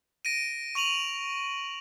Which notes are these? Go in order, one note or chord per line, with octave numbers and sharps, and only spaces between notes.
A#6 D7 D#7
C#6 D#7 F7 F#7